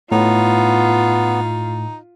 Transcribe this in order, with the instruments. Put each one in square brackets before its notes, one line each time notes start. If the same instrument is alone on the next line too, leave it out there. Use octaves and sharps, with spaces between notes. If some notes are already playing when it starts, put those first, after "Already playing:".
[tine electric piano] A2 [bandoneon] B3 [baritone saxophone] D#4 [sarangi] F4